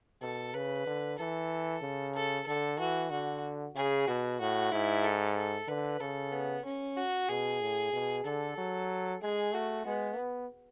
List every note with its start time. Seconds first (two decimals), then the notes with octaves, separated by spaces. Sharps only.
0.22 B2 A4
0.54 C#3 B4
0.87 D3
1.19 E3 A4
1.82 C#3
2.15 A4
2.46 D3 A4
2.79 E3 F#4
3.11 D3 F#4
3.75 C#3 G#4
4.07 B2 F#4
4.40 A2 F#4
4.72 G#2 E4
5.04 A4
5.36 A4
5.68 D3 B4
6.00 C#3 A4
6.32 B3
6.65 C#4
6.97 F#4
7.29 B2 G#4
7.61 A2
7.93 B2
8.25 D3 A4
8.57 F#3
9.22 G#3 G#4
9.53 A3 F#4
9.86 G#3 B3
10.18 B3